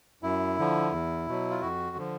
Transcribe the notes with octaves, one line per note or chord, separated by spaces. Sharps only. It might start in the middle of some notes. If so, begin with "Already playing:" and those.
F#2 E4
D3 F3
E2
B2 F#3
F4
F2 F#4
D3 F3